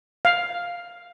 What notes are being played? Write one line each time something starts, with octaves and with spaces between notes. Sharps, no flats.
F5